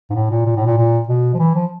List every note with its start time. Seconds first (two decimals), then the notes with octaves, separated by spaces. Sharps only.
0.10 G#2
0.15 A2
0.30 A#2
0.46 A#2
0.56 A2
0.66 A#2
0.77 A#2
1.08 B2
1.34 F3
1.39 E3
1.55 F3